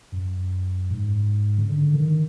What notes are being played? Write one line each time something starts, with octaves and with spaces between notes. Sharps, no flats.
F#2
G#2
C#3
D3
D#3